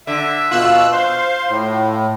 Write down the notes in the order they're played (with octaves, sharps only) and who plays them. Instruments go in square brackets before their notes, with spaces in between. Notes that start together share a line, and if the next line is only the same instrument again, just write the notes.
[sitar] D3 [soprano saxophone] E5
[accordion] B2 E6 F#6 [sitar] F4
[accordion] C5 F5 [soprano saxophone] C6
[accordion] A2